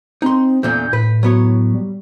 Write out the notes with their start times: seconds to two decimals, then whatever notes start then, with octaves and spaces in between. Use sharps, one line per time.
0.22 C4 D#4 C6
0.63 E2 A#2 D3 G6
0.93 A2 B4
1.23 F#3 B3 C#5
1.74 G3